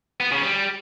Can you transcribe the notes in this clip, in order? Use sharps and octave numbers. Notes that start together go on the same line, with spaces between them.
B3
C#3
G3